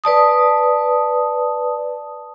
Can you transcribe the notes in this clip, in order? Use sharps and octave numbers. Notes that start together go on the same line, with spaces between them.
B4 D5 A5 D#6